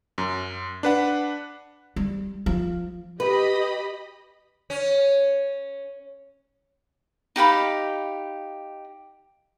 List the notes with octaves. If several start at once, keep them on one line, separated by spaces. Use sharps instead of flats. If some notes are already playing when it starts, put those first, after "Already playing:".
F#2
D4 B4 F#5
G3
F3
G4 B4 D#5 B5
C#4
D#4 G4 F5 B5